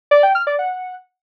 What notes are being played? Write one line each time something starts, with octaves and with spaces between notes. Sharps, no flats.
D5
G5
F6
D5
F#5